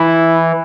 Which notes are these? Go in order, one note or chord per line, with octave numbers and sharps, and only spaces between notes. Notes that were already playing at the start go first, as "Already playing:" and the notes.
Already playing: E3 E4